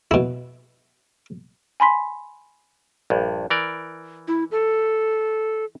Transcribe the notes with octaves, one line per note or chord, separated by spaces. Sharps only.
B2 E4
G#5 B5 C6 B6
A#1 G2
E3 A#4 D5
E4
A4